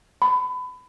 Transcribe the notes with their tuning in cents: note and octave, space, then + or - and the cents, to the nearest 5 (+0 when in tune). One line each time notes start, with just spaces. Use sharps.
B5 +30